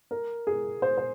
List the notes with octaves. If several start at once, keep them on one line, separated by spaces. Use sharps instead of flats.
A#4
G#4
C5
C5